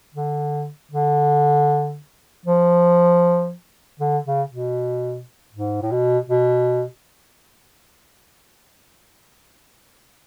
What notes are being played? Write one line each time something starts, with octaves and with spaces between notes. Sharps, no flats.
D3
D3
F3
D3
C#3
B2
G#2
A2
B2
B2